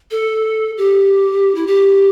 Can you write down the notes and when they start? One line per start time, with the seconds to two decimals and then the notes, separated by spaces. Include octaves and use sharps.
0.11 A4
0.77 G4
1.55 E4
1.67 G4